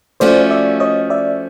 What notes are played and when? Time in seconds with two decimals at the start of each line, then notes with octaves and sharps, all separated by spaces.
0.20 F3 A3 C#4 F#4 C5 D5
0.51 D5 E5
0.80 C#5 D#5
1.10 D5 E5